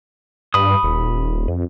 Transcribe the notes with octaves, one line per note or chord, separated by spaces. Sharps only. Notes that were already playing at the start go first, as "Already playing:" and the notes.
G2 B5 D#6
D#1
F2